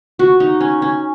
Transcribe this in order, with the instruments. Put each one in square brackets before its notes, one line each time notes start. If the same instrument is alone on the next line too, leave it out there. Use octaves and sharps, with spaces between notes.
[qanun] F#4
D#4
C#4
C#4